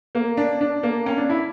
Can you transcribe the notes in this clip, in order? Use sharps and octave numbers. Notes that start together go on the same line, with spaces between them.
A#3
D4
D4
A#3
C#4
D4
E4